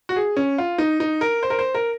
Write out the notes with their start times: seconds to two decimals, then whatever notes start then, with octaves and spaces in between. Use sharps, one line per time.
0.09 F#4
0.16 G#4
0.37 C#4
0.58 F4
0.78 D#4
1.00 D#4
1.21 A#4
1.43 C5
1.50 A#4
1.59 C5
1.74 A#4